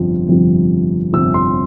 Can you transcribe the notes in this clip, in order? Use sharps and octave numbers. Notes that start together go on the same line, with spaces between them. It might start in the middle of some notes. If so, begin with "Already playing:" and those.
Already playing: G1 F2 C3 F3
G1 F2 C3 F3
G1 F2 C3 F3 E6
C6